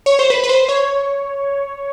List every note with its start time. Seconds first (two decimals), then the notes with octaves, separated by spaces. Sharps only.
0.06 C#5
0.19 C5
0.30 B4
0.44 B4
0.49 C5
0.69 C#5